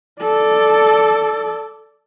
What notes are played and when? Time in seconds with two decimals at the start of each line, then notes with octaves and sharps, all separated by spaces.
0.22 A4 D5